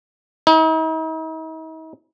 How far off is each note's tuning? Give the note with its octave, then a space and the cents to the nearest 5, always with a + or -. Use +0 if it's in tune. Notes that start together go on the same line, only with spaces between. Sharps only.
D#4 +45